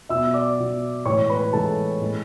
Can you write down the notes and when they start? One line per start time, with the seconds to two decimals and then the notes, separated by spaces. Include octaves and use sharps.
0.09 B2 F#3 E5 E6
0.34 D5 D6
0.58 B2 F#3
1.05 A2 E3 G#3 C#5 C#6
1.30 B4 B5
1.53 A2 E3 G#3 A4 A5
2.01 A2 G#3